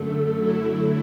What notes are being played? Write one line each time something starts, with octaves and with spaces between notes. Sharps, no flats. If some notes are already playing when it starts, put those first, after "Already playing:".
Already playing: F#2 D3 A3 A4
D3 F#3 A3 E4